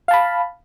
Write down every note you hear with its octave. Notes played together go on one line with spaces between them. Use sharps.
F5 A5 B5